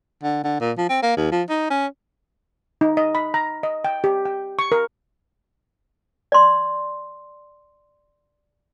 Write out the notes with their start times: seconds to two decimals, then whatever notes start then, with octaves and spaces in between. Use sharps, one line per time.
0.23 D3
0.44 D3
0.60 A#2
0.77 F3
0.89 C4
1.02 A#3
1.16 D#2
1.31 F3
1.49 D#4
1.70 C#4
2.81 D#4
2.97 D#5
3.15 B5
3.34 A#5
3.63 D#5
3.85 G5
4.04 G4
4.25 G5
4.59 C#6
4.72 A#4
6.32 D5 C6